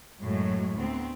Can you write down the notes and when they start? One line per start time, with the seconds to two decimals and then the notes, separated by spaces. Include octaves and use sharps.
0.21 F#2 A2 F#3 G#3
0.76 D2 B3 C4